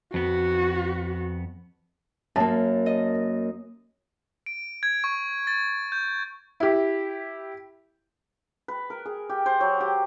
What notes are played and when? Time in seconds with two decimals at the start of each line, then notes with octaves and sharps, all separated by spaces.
0.14 F2 B3 F#4
2.36 F#2 A#3 A5
2.86 D#5
4.46 D7
4.83 G#6
5.04 C#6
5.47 A6
5.92 G6
6.60 E4 G4
8.68 B4
8.90 A#4
9.05 G#4
9.29 G4
9.46 C5
9.61 F#3
9.80 G4